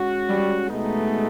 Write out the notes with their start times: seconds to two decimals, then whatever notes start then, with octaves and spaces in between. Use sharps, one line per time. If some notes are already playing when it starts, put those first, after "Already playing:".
Already playing: G#3 C#4 F#4
0.29 G3
0.70 B2 G#3 A3 B3 D#4